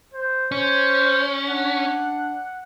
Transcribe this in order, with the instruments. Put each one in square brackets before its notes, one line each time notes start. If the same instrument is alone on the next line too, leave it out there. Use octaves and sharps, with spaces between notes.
[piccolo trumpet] C5
[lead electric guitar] C#4 [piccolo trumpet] C5 [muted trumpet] C#5
[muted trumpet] D4 [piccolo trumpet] F#5